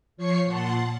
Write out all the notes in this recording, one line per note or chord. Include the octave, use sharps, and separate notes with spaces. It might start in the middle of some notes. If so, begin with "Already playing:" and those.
F3 C#5 C#6 C7 C#7
A#2 F#5 A5 C6